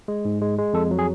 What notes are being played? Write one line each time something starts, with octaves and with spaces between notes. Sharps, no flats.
G#3
G#2
G#3
G#3
F2 A4
F#3
G#4